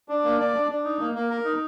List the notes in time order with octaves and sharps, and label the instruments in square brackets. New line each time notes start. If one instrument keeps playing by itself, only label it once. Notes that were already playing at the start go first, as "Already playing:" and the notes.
[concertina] D4
A#3
D5
D4
D4
D#4
A#3
A#3
A#4
D#4